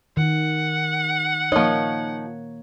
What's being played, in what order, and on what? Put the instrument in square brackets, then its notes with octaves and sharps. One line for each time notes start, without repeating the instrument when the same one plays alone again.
[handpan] D#3 [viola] F#5
[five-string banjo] F3 D#4 [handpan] A#3 C#5